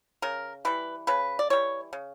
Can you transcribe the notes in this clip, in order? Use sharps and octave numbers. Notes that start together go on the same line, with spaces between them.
C#3 A#4
E3 G3 B4
C#3 B4
D5
E3 G3 C#5
C#3